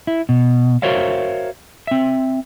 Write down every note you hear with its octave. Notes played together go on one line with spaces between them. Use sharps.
E4
B2
F#4 A#4 C5 C#5 E5 F5
C4 E5